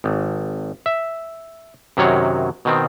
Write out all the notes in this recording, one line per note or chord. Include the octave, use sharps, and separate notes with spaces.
G#1
E5
F#2 C3 D#3 F#3 C#5
B2 D#3 C4